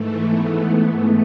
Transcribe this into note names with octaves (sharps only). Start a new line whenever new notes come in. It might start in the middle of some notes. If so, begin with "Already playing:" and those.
Already playing: G#2 E3 A3
B3
A3